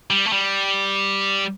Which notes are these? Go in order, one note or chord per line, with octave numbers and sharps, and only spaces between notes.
G3
A3
G3